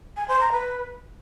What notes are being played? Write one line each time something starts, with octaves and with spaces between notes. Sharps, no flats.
G#5
C5
A#5
B4